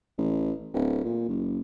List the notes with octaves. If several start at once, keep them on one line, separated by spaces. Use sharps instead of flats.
A1
D1
A#2
F#1